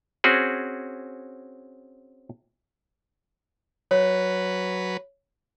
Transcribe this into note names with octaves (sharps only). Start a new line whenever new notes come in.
C4 C#4 F#4 G#4
F#3 B4 C#5